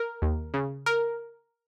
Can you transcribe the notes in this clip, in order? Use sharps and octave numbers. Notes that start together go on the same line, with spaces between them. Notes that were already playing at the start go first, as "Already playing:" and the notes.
Already playing: A#4
D#2
C#3
A#4